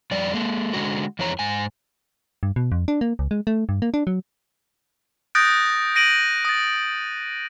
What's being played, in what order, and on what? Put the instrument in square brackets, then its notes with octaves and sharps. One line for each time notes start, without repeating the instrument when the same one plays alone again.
[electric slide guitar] F2 G3 D5
G#3 A#3 A4
D3 G#3 F#4
F2 E3 G#4 C#5 A#5
G#2 G#5
[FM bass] G2
B2
F2
D4
A#3
C#2
G#3
A3
G2
A#3
D4
F#3
[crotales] D#6 F#6 G6 A6 A#6 D7
A#6 D7 D#7 F#7
D#6 A6